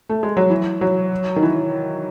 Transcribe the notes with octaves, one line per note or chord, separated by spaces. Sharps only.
A3
G#3
F#3
E3
F#3
D#3
E3